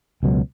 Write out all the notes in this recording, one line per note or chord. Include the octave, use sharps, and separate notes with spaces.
C#2 B2 F#3